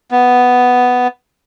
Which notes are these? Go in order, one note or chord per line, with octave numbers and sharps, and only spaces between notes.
B3